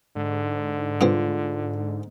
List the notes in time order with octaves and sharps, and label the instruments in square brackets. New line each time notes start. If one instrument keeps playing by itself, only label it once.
[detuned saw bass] G#2 [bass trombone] D3
[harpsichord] G2 C#3 C4 [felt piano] F4